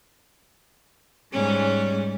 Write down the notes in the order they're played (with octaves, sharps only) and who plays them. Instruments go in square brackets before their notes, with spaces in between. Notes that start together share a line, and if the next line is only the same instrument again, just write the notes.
[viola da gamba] G#2 C#4 [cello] G3